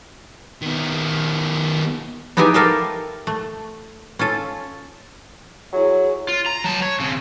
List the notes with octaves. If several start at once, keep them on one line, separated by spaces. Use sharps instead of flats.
D#3 B3
B3 D#4 E4 G4 G#4 G#5
G4 A4 A#4 E5 F5 G5
A3
C#4 F4 A4
F#3 E4 G#4
F4
A#5
F#3 A5
C#5
C#3 C4